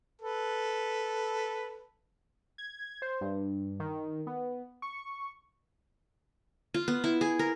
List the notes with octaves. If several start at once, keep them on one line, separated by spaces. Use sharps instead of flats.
A4 B4
G#6
C5
G2
D#3
B3
C#6
F4
B3
E4
G#4
A#4